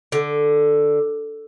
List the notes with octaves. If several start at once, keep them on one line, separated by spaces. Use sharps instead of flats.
D3